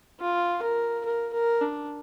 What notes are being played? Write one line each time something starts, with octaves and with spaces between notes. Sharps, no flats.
F4
A#4
A#4
A#4
D4